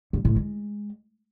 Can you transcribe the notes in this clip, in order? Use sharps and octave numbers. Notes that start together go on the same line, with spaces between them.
G2
A2
G#3